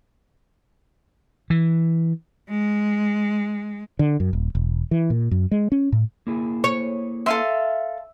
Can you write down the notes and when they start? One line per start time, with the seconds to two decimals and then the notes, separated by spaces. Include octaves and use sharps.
1.50 E3
2.49 G#3
3.99 D3
4.20 F#2
4.33 D#1
4.55 E1
4.91 E3
5.10 A#2
5.31 F#2
5.51 G#3
5.72 C#4
5.92 A2
6.27 A#3 E4 G#4
6.64 C#5
7.26 A4 E5 F5 C6 D#7